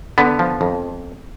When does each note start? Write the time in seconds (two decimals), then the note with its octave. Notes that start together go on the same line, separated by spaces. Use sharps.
0.18 D3 B3
0.39 F3
0.61 F2